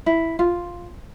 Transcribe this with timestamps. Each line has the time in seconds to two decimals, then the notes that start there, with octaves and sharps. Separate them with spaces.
0.06 E4
0.39 F4